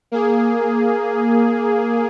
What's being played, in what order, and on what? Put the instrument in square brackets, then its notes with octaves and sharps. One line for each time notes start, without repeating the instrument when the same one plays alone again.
[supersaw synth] A#3 G#4